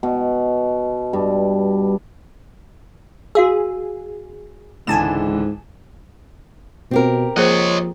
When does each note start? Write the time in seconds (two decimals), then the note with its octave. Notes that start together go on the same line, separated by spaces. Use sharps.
0.03 B2
1.13 G2
3.35 F#4 G#4 F5 E6
4.87 C#2 G#2 D3 E3 G#5 A5 E7
6.91 B2 C4 G4 A#4
7.36 F3 A#3 G#4 C5 C#5 D#5